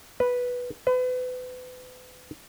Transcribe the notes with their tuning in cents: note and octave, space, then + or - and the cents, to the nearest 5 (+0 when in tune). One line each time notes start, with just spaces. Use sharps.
B4 -5
B4 +35